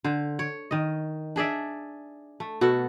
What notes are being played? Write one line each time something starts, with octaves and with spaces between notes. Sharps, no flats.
D3 C5
C#5
D#3 D#5
D4 G#4 D5 E5
A3
B2 F#4 A4